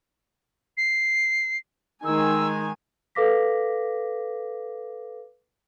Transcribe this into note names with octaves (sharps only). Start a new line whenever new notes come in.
C7
D#3 G#3 G#5 E6
A4 B4 F5 D6 A#6 B6